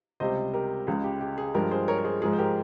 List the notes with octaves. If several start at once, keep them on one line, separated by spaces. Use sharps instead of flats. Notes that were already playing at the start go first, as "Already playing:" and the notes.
C#2 C3 G3 C5 D#5
G4 A#4
C#2 C#3 G#3 G#4
G4
G4
G#4
G2 F3 G#3 G4 A#4
G#4 C5
A#4 C#5
A#4
G#4 C5
G#2 F3 G#3 G#4
C5
G4 A#4